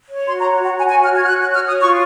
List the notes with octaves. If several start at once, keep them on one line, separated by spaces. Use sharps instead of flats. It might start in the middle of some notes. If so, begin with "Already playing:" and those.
C#5
F#4 C6
A#5
C#5
F#4 F#5
F#4 G#5
G#5
C#5
F6
F#4 G#6
F6
F#4 F#6
F#6
C#5
F6
C#5 D#6
F4 C#6